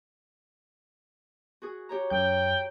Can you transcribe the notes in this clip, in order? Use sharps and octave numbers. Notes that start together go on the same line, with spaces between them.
F#4 G#4
G4 C#5 A#5
F#2 G5 G6